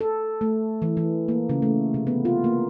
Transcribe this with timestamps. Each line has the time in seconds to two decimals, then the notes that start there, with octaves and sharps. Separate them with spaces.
0.01 A4
0.41 A3
0.82 E3
0.97 E3
1.28 A#3
1.49 C#3
1.62 A3
1.94 C3
2.07 B3
2.25 F4
2.44 A#3